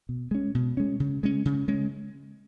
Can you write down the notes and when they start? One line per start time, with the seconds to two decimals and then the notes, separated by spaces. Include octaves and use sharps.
0.09 B2
0.31 G#3 C#4
0.55 B2
0.77 G#3 C#4
1.00 C#3
1.23 G#3 C#4
1.45 C#3
1.68 G#3 C#4